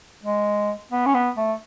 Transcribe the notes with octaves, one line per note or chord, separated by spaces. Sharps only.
G#3
B3
C#4
B3
A3